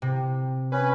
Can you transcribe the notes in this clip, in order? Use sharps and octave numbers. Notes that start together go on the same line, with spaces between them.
C3
C#4 B4